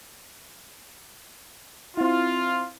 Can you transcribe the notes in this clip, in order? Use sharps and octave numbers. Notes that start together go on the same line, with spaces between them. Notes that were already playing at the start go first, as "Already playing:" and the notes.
C4 E4 F4